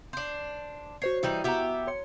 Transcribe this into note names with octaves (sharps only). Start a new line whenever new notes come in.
D4 C5
F#4 C5 C#5 C7
E3 G3 D#4 E4
B3 F#4 G4 E5 A#5
C#5 C6 C#7